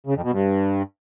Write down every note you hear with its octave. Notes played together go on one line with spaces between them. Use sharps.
C#3
F2
B2
G2